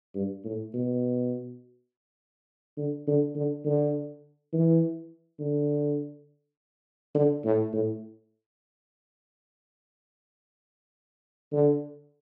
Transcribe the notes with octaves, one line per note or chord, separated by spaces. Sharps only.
G2
A2
B2
D3
D3
D3
D3
E3
D3
D3
A2
A2
D3